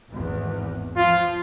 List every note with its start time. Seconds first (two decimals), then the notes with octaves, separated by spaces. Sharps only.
0.11 G#1 E2 A2
0.96 F3 F4